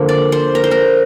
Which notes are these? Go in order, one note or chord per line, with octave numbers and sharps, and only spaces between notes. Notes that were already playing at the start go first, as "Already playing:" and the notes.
Already playing: D3 F3 A#3
D5
C5
A#4
C5
A#4